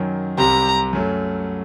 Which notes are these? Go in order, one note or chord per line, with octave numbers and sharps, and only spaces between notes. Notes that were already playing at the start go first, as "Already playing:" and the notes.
Already playing: F#2 D#3 F#3
C2 C3 G3 C4 G4 A#5
F#2 F#3 A3